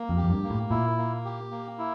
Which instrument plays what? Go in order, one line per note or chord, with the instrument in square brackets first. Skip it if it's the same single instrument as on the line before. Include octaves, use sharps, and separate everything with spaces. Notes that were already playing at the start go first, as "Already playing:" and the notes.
Already playing: [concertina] A#3
[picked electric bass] F2
[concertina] G4
[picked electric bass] F2
G2
[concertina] A#3
[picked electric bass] A2
[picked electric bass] A#2 [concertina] E4
[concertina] A#3
G4
A#3
E4